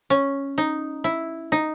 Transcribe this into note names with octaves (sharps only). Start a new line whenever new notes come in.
C#4
D#4
E4
D#4